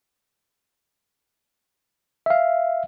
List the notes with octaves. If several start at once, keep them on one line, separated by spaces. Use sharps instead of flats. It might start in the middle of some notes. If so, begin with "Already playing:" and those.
E5 F5